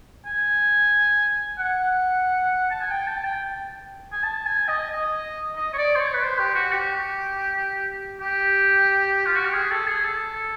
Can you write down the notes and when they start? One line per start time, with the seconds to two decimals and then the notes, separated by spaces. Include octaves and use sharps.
0.26 G#5
1.59 F#5
2.71 A5
2.81 G#5
2.91 G5
3.07 A5
3.24 G5
4.12 G#5
4.23 A5
4.46 G#5
4.68 D#5
4.90 D#5
5.56 D#5
5.73 C#5
5.78 D5
5.95 C5
6.00 C#5
6.14 B4
6.23 C5
6.39 G4
6.55 F#4
6.72 G4
8.21 G4
9.26 F4
9.36 F#4
9.45 G4
9.54 G#4
9.71 A4
9.87 G#4
10.04 A4